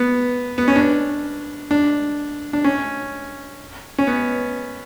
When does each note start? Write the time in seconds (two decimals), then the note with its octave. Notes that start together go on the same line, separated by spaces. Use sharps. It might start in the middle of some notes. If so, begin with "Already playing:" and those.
Already playing: B3
0.58 B3
0.68 C#4
0.76 D4
1.71 D4
2.53 D4
2.64 C#4
3.98 C#4
4.07 B3